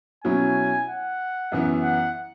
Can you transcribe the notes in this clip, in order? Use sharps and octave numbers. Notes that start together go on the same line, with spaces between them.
B2 F#3 C#4 E4 G#5
F#5
F#2 E3 B3 E4
F#5